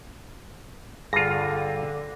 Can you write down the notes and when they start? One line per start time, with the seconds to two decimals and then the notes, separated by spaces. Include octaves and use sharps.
1.13 G2 D3 F4 G#4 A#6